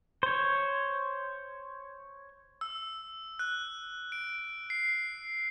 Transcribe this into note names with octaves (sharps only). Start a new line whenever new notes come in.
C5 C#5
E6
F#6
D7
C7